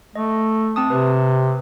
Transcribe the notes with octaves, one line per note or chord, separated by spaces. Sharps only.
A3 D#5
C4 A5 D#6
C3 B4